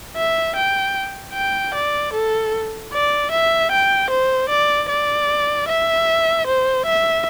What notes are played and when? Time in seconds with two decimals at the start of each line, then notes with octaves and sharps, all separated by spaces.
0.17 E5
0.56 G5
1.34 G5
1.74 D5
2.13 A4
2.93 D5
3.31 E5
3.71 G5
4.10 C5
4.49 D5
4.89 D5
5.68 E5
6.47 C5
6.86 E5